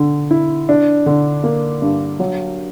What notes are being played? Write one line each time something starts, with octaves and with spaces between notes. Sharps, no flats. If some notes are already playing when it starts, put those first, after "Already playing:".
Already playing: D3
E4
D4
D3
A#3
G2
F#3